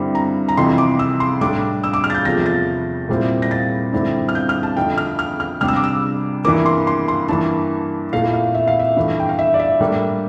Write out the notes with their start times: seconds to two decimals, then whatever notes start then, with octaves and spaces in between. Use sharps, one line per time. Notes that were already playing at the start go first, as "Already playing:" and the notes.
Already playing: G2 D3 G3 C4 E4
0.15 A#5
0.49 A#5
0.57 F2 C3 E3 C6
0.78 D6
0.99 E6
1.20 C6
1.41 A2 G3 D4 D6
1.84 E6
1.93 D6
2.04 F6
2.10 A6
2.15 G6
2.25 E2 C3 F3 A3 A#6
2.46 A6
3.09 A#2 G3 C4 E4
3.42 A#6
3.51 A6
3.93 G2 D3 G3 C4 E4
4.29 F6
4.35 G6
4.49 F6
4.63 A5
4.77 F2 D3 A3 G5
4.98 F6
5.19 F6
5.40 F6
5.61 C3 G3 D4 F6
5.68 E6
5.76 D6
5.84 E6
6.44 G2 E3 A#3 D6
6.66 C6
6.87 C6
7.08 C6
7.28 G2 E3 A#3 A5
8.13 A#2 A3 E4 F5
8.33 F5
8.55 E5
8.68 F5
8.79 E5
8.96 G2 E3 A3
9.20 G5
9.29 F5
9.39 E5
9.54 D5
9.59 E5
9.80 A2 G3 A#3 D4